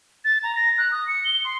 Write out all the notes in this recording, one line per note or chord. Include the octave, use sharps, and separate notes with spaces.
A6
A#5
A#6
F#6
D#6
C#7
G7
C6